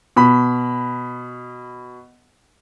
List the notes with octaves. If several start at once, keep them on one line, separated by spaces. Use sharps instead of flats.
B2 B5